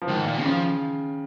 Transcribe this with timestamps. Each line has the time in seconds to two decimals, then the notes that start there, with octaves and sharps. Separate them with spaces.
0.02 F3
0.07 G#2 D#3
0.26 A#2
0.44 C#3 F3